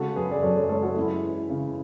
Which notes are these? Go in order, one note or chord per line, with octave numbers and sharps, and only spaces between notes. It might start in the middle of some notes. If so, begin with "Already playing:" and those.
Already playing: C#3 G#3 F#4 A4
F#2 G#4 B4
D5
F#2 A4 C#5
A4 C#5
G#3 A4 C#5
F#4 A4
G#3 C#4 E4
E3
C#3